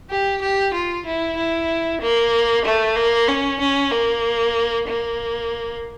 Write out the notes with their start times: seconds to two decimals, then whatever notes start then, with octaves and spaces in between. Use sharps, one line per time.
0.10 G4
0.42 G4
0.74 F4
1.06 E4
1.37 E4
2.01 A#3
2.65 A3
2.97 A#3
3.28 C#4
3.60 C#4
3.92 A#3
4.88 A#3